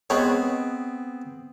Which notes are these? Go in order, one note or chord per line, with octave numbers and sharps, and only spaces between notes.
G#3 B3 C4 G#4 B4 C#5